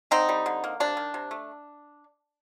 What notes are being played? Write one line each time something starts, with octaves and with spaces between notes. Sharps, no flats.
D3 C4 D#4
G3
D3
A#3
C3 D4
D#3
C3
A3